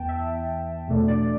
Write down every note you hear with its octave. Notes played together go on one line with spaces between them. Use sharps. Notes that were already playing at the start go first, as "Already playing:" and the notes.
Already playing: E2 E3 B3 G5 A5
E5
E2 B2 A3 D4
D5